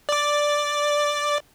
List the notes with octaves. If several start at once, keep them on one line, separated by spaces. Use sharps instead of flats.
D5 D6